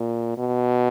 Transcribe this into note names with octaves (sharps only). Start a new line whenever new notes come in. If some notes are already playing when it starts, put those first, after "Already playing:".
Already playing: A#2
B2